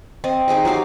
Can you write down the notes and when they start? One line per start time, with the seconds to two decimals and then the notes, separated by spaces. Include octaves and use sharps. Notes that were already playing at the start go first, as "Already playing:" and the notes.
0.24 C4 D#5
0.48 D#4 G#4 C5 D#5
0.65 F#3 F#4 G4 F5